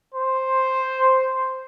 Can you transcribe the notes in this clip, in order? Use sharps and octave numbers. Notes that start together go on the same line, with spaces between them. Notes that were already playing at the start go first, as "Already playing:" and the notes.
C5